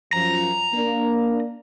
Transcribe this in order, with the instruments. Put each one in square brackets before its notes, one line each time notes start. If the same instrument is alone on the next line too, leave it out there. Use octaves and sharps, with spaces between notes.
[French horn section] F#2 F3 [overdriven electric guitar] A#5
[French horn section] A#3 D4